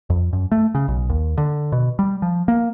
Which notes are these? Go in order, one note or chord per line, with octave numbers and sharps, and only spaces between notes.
F2
F#2
A3
C#3
B1
D#2
D3
B2
G3
F3
A#3